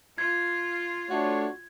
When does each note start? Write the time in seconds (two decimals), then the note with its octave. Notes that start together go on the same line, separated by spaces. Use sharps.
0.18 F4 G#6
1.10 A3 D4 F#4 C#5